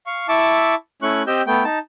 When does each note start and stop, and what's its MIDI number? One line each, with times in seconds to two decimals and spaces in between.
0.06 0.27 77
0.06 0.27 85
0.29 0.75 64
0.29 0.75 76
0.29 0.75 81
0.29 0.75 85
0.29 0.75 86
1.02 1.22 57
1.02 1.22 61
1.02 1.22 64
1.02 1.22 85
1.02 1.22 90
1.27 1.42 60
1.27 1.42 67
1.27 1.42 75
1.27 1.42 88
1.27 1.42 91
1.47 1.64 57
1.47 1.64 59
1.47 1.64 79
1.64 1.79 63
1.64 1.79 81